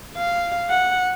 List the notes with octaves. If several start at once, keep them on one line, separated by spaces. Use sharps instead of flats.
F5
F#5